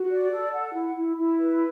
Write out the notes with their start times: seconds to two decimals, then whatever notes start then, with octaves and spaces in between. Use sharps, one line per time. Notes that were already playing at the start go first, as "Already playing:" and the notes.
Already playing: F#4
0.11 D5
0.32 A4
0.53 F#5
0.74 E4
0.96 E4
1.18 E4
1.39 B4